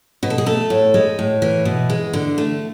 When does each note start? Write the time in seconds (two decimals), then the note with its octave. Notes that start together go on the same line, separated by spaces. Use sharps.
0.23 B2 B4
0.30 A4
0.38 G#4
0.46 A3 A4
0.70 A2
0.94 G#3
1.19 A2
1.42 E3
1.65 B2
1.90 G#3
2.13 D3
2.38 A3